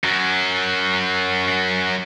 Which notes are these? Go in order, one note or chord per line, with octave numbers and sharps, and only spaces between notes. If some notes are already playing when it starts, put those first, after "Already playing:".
F#2 F#3